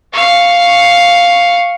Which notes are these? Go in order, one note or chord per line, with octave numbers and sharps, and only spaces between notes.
F5 C#6